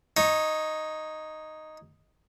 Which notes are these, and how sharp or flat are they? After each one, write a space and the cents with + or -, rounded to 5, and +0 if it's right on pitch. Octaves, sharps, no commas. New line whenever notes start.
D#4 +0 C#5 -10